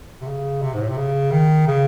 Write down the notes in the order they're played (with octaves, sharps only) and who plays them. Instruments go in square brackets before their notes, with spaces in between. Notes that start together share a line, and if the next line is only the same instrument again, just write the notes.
[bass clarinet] C3
C#3
C3
G#2
A2
C3
C#3
D#3
C#3